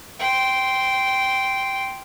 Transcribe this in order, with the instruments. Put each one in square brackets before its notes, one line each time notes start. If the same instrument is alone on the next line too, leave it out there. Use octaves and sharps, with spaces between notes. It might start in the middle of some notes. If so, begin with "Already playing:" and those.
[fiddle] G5 C6